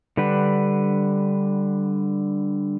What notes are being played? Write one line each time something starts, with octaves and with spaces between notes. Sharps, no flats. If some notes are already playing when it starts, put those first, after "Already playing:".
D3 G3 D4 B4 F#5